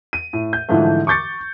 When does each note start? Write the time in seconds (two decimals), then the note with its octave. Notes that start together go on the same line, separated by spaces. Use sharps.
0.13 D#7
0.33 A2
0.53 G6
0.69 G#2 D3 E3 F3 A3
1.07 C#6 D6 G6 A6 C#7